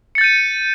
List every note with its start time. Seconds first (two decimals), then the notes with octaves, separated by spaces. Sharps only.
0.15 C#7
0.18 A6
0.21 G6
0.24 D#7